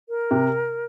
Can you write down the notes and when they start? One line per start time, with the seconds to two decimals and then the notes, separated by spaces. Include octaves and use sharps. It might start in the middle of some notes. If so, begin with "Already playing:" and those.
0.09 A#4
0.31 C3